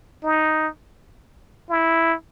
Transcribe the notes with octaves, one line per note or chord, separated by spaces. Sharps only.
D#4
E4